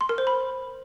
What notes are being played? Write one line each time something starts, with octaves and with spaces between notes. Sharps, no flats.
C6
A#4
C5
B5